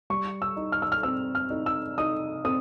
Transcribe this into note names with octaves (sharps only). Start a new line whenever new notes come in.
G3 C#6
E6
D#4
F6
E6
F6
C4 E6
F6
D#4
E6
D#4 D#6
C4 D#6